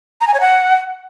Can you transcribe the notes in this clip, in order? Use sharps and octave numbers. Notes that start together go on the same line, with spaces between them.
A#5
G#5
C#5
F#5